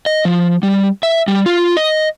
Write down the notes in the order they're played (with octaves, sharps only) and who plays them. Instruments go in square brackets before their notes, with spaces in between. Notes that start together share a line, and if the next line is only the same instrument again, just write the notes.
[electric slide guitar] D#5
F3
G3
E5
G3
F4
D#5